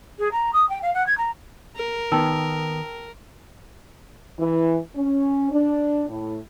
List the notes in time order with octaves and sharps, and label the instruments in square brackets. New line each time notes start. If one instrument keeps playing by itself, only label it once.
[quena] G#4
A#5
D#6
G5
F5
F#5
G#6
A#5
[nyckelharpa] A#4
[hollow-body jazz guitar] D#3 B3 [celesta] G5 A5 E6
[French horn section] E3
C#4
D4
A2